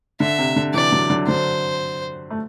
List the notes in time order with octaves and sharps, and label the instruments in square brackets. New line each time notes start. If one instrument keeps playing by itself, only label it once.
[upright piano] D3 [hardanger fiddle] E5
[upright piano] C3
D3
[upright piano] C3 E3 [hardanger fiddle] D5
[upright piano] D3 F#3
D3 F#3
[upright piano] D3 F#3 [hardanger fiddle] C5
[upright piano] A3